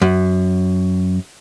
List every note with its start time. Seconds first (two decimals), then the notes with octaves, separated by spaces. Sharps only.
0.02 F#2